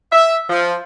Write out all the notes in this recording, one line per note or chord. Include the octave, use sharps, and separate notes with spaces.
E5
F3